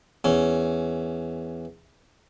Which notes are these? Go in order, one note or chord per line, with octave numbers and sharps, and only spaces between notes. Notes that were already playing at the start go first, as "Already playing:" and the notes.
E2 C#4